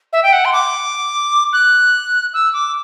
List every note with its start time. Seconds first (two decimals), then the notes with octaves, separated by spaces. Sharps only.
0.13 E5
0.23 G5
0.33 F#5
0.45 C6
0.53 D6
1.53 F#6
2.34 E6
2.54 D6